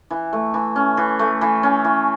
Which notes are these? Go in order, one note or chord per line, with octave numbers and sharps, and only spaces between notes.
E3
A3
E3
C#4
E3
A3
E3
C#4
E3